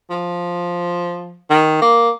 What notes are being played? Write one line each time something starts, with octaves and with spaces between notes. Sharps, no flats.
F3
D#3
A#3